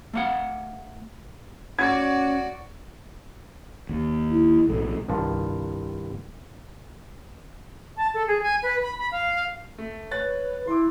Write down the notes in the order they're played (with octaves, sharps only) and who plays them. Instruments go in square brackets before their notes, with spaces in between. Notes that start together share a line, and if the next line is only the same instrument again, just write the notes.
[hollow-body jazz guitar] A3 F5 F#5
[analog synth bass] C#4 [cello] F#4 D5 [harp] F#5 [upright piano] G#6
[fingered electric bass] D#2
[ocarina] E4
[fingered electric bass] B1 A2 [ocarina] A4
[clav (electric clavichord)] C2 G2 D#3 F4 A5
[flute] A5
A4
G#4
G#5
B4
B5
B5
F5
[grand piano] A3
[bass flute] B4 [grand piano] C#5 F#6 A6
[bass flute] E4 [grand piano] C6 D6